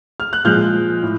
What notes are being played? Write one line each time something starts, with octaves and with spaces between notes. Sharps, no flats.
F6
F#6
A#2 F3 G#3 F6 G6
A2